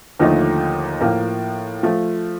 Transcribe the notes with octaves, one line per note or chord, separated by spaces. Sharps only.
D#2 D3 F3 A3 D#4
A2 F3 A#3
F3 A3